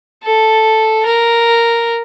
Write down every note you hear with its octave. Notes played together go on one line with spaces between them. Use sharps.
A4
A#4